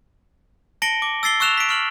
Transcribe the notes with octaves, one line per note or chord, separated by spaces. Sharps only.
A5 A#6 C#7 D7 F#7 G7
D6
E6 A6 C7 G7
C#6 E6 F#6 E7 F7
B6 D7
C#6 F6 F#7